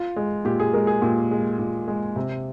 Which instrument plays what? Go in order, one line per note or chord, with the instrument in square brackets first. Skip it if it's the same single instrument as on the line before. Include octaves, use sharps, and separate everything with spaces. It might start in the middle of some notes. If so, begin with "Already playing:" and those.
Already playing: [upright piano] F4
G#3
A#2 G4
G#4
G#3 A#4
G#4
A#2 G4
G#3
A#2
G#3
C3